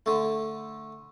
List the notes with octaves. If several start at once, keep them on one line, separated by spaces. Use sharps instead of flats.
D3 A3